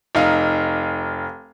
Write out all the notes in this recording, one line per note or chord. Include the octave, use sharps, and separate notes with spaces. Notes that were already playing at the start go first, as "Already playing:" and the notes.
F1 D#4 F5